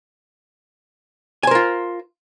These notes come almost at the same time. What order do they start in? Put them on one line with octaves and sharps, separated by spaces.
G#5 C5 A#4 F4